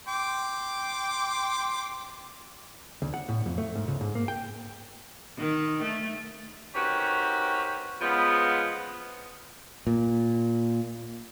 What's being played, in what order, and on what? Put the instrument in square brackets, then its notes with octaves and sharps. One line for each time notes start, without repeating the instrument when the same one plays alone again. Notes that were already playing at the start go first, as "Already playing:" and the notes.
[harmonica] G5 C6 D6
[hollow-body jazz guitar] D2
F#5
A2
F2
A3
G#2
C#2
G#2
A#3
G5
[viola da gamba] D#3
A3
[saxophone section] D#3 C4 C#4 F#4 G4 B4
C#3 F3 G#3 B3
[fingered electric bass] A#2